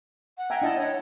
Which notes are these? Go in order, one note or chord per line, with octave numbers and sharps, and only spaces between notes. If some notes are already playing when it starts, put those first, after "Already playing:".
F#5
E5 G5 G#5 A#5
D4 E4 D#5 A5
C#5